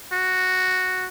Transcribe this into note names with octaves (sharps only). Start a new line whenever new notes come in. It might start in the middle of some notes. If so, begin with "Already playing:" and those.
F#4